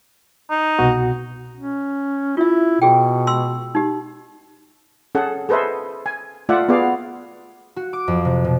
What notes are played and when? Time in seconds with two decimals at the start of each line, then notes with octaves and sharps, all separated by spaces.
0.50 D#4
0.79 C2 B2 F#4
1.56 C#4
2.37 E4 F4 E5
2.82 B2 F#4 G#4 G5
3.27 C6 E6
3.75 D#4 G4
5.15 C#4 G#4 A4 F#5
5.49 G#4 A4 B4 C5 D#5 E5
6.06 G#5
6.49 A3 F4 D5 E5 F#5
6.69 B3 F#4 G#4 D5 F5
7.76 F#4
7.93 D6
8.08 F2
8.25 C3
8.44 B2